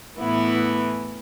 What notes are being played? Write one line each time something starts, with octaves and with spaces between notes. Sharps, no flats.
A2 E3 B3 E4